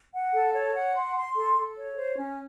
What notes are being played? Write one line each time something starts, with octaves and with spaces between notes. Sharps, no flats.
F#5
A4
C#5
F#5
C6
C6
A4
A4
C#5
C5
C#4